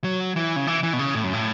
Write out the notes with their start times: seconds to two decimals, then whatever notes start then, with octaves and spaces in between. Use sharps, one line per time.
0.04 F#3
0.36 E3
0.56 C#3
0.67 E3
0.83 E3
0.93 B2
0.99 C#3
1.15 A2
1.24 F#2
1.33 A2